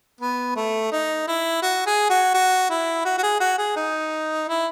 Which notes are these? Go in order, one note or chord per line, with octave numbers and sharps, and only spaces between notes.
B3
A3
D#4
E4
F#4
G#4
F#4
F#4
E4
F#4
F#4
G#4
F#4
G#4
D#4
E4